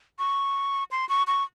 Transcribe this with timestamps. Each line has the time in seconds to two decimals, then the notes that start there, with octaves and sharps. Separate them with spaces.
0.19 C#6
0.91 C6
1.09 C#6
1.27 C#6